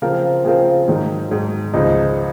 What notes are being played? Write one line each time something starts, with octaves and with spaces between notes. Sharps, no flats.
C#3 F3 C4 F4 A#4
C#3 F3 C4 F4 A#4
G#2 D#3 F#3
G#2 D#3 F#3
C#2 C#3 F3 G#3 D#4